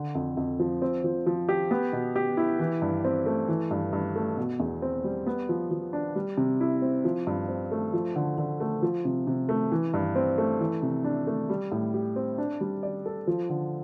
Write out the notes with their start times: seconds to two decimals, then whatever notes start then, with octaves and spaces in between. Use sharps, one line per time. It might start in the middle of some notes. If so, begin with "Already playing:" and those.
Already playing: D3
0.15 F2
0.37 F2
0.59 F3
0.82 C4
1.04 F3
1.26 F3
1.49 G4
1.71 B3
1.93 B2
2.16 G4
2.37 E4
2.59 E3
2.82 G2
3.04 C4
3.26 A3
3.48 E3
3.71 G2
3.93 G2
4.16 A3
4.37 B2
4.60 E2
4.82 C4
5.04 G3
5.27 B3
5.49 F3
5.71 F3
5.93 D4
6.16 G3
6.37 C3
6.60 E4
6.82 C4
7.05 F3
7.27 G2
7.48 C4
7.72 A3
7.93 F3
8.16 D3
8.38 D3
8.60 A3
8.82 F3
9.05 C3
9.27 C3
9.49 A3
9.72 E3
9.94 G2
10.16 C4
10.38 A3
10.61 E3
10.82 C3
11.04 D4
11.27 A3
11.50 G3
11.72 A2
11.94 G4
12.16 C4
12.38 D4
12.61 G3
12.83 D5
13.06 A4
13.27 F3
13.50 D3